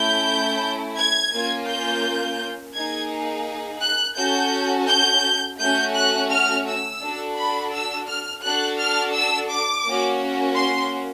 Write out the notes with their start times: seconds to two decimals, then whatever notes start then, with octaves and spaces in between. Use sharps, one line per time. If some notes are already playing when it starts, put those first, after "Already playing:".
Already playing: A3 C#4 E4 G6
0.97 G#6
1.32 A#3 C#4 F4
1.68 G6
2.74 A#3 D#4 G#4 G#6
3.81 F#6
4.17 C#4 F#4 A4 G6
4.88 G6
5.59 A3 C#4 F#4 G6
5.94 F#6
6.30 F6
6.66 E6
7.01 D4 F#4 A4
7.37 B5
7.73 E6
8.08 F6
8.43 D4 F#4 A4 F#6
8.79 F6
9.14 E6
9.50 D6
9.86 A#3 C#4 F#4
10.56 C6